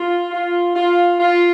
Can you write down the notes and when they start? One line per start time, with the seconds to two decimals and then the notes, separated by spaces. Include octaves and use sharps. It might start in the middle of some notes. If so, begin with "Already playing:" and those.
Already playing: F4
0.31 F4
0.75 F4
1.20 F4